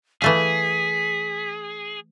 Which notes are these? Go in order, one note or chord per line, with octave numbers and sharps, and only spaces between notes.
E3 A3 G#4 F5 B6